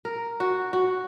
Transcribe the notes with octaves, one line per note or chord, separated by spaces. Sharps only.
A#4
F#4
F#4